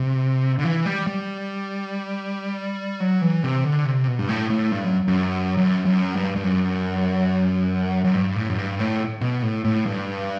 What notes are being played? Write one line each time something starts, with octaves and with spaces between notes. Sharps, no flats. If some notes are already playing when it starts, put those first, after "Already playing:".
Already playing: C3
D3
E3
G3
G3
F#3
E3
C3
D3
C3
B2
G2
A2
A2
G2
F#2
F#2
F#2
F#2
G2
G2
F#2
F#2
G2
A2
F#2
G2
A2
B2
A2
A2
G2